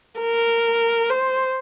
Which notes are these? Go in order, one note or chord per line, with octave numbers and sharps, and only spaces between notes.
A#4
C5